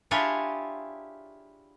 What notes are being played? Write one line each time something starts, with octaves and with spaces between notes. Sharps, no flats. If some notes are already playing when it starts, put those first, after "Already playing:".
D4 E4 F4 G4 G#4 C#5